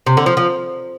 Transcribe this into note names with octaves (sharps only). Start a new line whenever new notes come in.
C3
D3
F3
F3